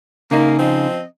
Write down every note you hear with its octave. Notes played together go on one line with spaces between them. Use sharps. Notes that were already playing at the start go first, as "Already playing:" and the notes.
C#3 A#3 D#4
F3 C4 D#5